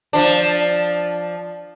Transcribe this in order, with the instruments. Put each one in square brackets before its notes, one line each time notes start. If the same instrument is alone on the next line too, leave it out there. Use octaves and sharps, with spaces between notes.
[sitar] F3 D4